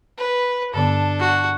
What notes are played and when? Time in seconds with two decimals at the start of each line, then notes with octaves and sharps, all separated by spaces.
0.18 B4
0.74 G2 D3 B3 D4 A4
1.19 F#4